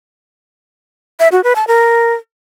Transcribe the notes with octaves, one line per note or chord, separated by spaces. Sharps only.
E5
F#4
B4
A5
A#4